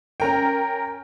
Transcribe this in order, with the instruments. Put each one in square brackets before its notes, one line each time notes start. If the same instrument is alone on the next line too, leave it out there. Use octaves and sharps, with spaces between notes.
[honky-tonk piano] C#4 A#4 G5